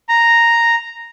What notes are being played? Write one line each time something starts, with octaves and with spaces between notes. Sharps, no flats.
A#5